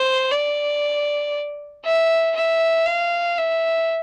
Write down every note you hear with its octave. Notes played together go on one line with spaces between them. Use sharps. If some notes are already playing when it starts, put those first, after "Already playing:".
Already playing: C5
D5
E5
E5
F5
E5